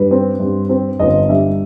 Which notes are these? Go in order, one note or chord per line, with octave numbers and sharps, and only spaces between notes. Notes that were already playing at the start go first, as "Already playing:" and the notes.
Already playing: G2 B4
C4
G2
C4
G1 D#5
G2 E5